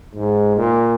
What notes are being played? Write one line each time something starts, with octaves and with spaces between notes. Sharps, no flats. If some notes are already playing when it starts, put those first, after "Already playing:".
G#2
A#2